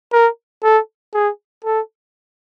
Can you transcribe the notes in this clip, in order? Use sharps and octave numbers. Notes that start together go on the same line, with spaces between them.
A#4
A4
G#4
A4